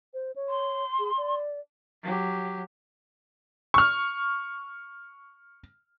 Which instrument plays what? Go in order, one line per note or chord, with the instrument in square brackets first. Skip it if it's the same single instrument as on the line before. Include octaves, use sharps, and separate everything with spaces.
[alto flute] C5
C#5
[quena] C6
[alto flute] G#4
D5
[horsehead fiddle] F#3 G4
[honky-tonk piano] C#6 F6